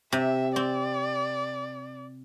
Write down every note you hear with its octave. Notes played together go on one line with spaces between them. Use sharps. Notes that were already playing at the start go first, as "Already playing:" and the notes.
C3 E5
C4 D5